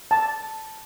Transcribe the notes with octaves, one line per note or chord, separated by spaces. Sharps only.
A5